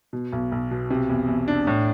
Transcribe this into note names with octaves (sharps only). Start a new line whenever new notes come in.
B2
B1
B1
B2
C3
E2
E2
D4
A2